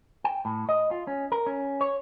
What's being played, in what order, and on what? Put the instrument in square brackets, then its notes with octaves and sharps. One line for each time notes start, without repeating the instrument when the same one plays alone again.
[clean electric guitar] G5
A2
D#5
F4
C#4
A#4
C#4
C#5